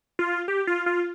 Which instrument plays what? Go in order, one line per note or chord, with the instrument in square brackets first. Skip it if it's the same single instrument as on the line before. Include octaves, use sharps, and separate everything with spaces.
[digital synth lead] F4
G4
F4
F4